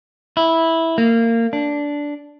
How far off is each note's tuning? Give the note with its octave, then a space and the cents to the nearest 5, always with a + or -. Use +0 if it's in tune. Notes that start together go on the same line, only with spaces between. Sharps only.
E4 -10
A#3 -25
D4 -10